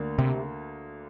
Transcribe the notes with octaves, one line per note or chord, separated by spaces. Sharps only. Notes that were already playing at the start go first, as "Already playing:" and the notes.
Already playing: D2 D3 A#3
C3